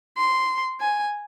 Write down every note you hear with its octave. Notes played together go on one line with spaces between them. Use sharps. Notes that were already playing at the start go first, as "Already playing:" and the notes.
C6
G#5